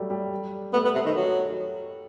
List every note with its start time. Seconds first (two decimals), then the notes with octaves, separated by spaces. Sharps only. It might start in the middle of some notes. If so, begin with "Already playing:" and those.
Already playing: F#3 G3 A3
0.10 G3
0.73 A3 B3
0.85 B3
0.95 C3
1.06 D#3
1.16 F#3